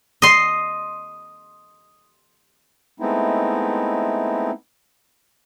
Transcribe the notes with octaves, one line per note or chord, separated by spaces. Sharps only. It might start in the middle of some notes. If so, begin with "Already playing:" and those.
D#5 C6
G#3 A3 B3 C4 D#4 E4